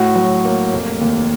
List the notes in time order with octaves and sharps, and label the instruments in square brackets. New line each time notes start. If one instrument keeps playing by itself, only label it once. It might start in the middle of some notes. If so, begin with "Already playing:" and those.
Already playing: [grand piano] A2 F#4
F#3
A#3
F1
D#2